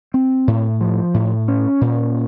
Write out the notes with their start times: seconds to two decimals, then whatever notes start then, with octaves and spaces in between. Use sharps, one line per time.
0.14 C4
0.47 A2
0.81 F3
1.14 A2
1.48 C#4
1.81 A#2